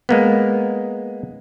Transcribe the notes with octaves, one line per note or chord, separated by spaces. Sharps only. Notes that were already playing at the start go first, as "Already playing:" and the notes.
G#3 A#3 B3